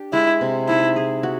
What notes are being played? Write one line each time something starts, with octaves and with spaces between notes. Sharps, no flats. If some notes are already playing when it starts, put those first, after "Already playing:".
Already playing: D4 G4
G#3 E4
C3
D#4 E4
G#4
F#4